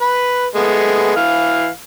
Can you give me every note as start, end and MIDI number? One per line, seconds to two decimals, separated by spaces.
0.01 0.45 71
0.55 1.16 56
0.55 1.16 57
0.55 1.16 59
1.16 1.69 52
1.16 1.69 77